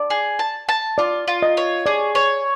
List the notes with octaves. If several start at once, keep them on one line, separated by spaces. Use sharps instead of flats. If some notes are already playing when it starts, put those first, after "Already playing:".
Already playing: D5
G#4
A5
A5
F4 D5
F4
D#5
C#5
G#4 D5
C#5